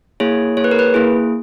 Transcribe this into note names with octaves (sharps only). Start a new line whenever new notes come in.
A#3 E4 G#4 C#5
A#3 E4 G#4 C#5
B4
A#4
B4
A#3 E4 G#4